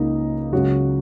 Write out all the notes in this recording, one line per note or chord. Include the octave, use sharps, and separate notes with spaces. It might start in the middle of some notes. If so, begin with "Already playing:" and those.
Already playing: C#2 C#3 A#3 D#4
C#2 C#3 F#3 F#4